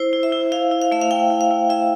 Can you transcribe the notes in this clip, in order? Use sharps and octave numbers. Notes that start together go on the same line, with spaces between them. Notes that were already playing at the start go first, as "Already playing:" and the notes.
Already playing: E4 C5
E4
E5
E4
E4 F5
E4
F5
A3 E5
F5
E4 G5
E4
F5
E4
E4 E5